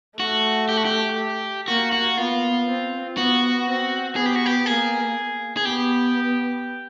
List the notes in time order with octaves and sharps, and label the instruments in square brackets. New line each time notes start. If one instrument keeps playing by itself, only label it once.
[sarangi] A3 [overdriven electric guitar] F#4
[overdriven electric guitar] G4
F#4
G4
[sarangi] A#3 [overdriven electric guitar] F#4
[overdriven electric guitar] F#4
[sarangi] B3 [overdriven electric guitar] F4
[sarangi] C4
[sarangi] B3 [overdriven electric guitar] F#4
[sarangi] C4
[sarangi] B3 [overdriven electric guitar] G#4
[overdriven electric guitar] G4
F#4
G4
[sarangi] A#3 [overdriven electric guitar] G#4
[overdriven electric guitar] G#4
[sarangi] B3 [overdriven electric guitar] G4